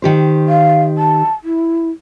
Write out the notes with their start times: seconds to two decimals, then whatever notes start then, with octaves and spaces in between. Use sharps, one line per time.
0.02 D#3 G4 C5
0.48 F5
0.98 A5
1.44 E4